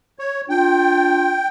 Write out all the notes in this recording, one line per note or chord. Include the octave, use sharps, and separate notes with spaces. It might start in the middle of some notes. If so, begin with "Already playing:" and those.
C#5
D4 F4 G5